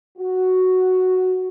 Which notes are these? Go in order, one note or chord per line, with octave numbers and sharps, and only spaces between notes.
F#4